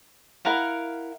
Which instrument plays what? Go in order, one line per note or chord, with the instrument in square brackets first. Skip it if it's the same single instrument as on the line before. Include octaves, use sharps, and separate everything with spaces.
[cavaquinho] E4 A#4 F5 F#5